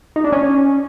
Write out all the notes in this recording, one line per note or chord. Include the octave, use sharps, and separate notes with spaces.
D#4
D4
C#4